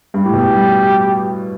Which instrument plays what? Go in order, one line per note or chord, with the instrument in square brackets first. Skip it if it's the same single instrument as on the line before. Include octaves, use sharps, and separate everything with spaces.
[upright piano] G2
[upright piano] A2 [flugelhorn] G4
[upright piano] B2
A2
G2